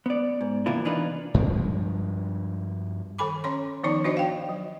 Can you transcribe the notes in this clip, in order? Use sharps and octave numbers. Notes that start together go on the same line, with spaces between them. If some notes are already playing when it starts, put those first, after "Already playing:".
B3 D5
G#2
C3 E3 A#3 B3 E4 F4
C3 E3 D4 D#4 F4 B4
G2 F3 G#3
D#3 A4 G#5 B5 D6
C#4 C#5 C6
D#3 F3 B3 D#4 C#5 D5
D4 F#4 C5 D5 D#5
F5 G5
F#3